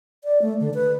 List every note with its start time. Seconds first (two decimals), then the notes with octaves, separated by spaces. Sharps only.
0.24 D5
0.42 A3
0.60 D3
0.74 B4